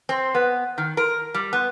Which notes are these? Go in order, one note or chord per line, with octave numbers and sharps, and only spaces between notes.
C4
B3
D#3
A#4
G3
B3